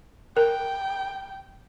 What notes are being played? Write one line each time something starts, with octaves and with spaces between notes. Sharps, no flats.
A#4 G5